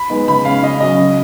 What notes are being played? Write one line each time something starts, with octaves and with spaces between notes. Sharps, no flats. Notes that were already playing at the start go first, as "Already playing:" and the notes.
Already playing: B5
G#3 B3 D#4
C#3 B5
G#3 C#4 F5
C#3 D#5
F#3 C#4 D#5
C#3